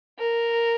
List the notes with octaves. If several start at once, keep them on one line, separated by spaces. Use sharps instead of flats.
A#4